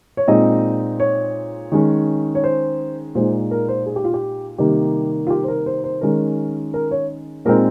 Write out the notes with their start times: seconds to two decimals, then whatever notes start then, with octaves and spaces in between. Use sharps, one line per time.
0.17 C#5
0.28 A#2 G#3 C4 D#4 D#5
1.00 C#5
1.72 D#3 G#3 C#4
2.35 C#5
2.44 C5
3.15 A#2 G#3 D#4 C5
3.51 A#4
3.68 C5
3.86 G#4
3.96 G4
4.04 F4
4.14 G4
4.58 C3 D#3 G3 A#3 D#4 G4
5.27 F4
5.30 G4
5.43 C5
5.48 A#4
5.66 C5
5.84 C5
6.01 D#3 G#3 C#4 A#4
6.74 A#4
6.91 C#5
7.45 A#2 G#3 C4 D#4 A#4